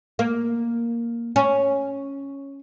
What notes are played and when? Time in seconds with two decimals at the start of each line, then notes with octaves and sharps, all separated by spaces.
0.19 A#3
1.36 C#4